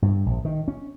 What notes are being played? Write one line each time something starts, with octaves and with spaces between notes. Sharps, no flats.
G2
A#1
D#3
C#4